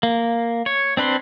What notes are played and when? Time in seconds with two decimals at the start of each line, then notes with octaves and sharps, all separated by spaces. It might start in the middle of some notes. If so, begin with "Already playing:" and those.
0.03 A#3
0.66 C#5
0.97 C4 D4 B4 C5